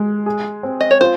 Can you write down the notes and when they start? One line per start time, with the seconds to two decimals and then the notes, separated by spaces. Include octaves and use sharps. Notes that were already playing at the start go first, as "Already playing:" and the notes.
Already playing: G#3
0.26 G#4
0.63 C4
0.81 D#5
0.91 C#5
1.01 F4 C5